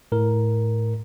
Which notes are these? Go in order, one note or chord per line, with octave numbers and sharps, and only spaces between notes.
A2 A#4